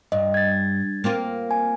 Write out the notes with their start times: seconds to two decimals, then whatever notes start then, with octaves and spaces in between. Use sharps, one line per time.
0.12 G2 D#5
0.34 G#6 A6
1.04 A#3 C4 F4
1.51 G#5